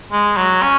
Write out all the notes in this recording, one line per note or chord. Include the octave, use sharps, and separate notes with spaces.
G#3
F#3
C#4